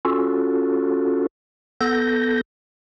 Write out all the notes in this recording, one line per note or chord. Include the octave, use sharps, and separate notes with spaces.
C#4 F4 F#4 A4
B3 A4 G6 A#6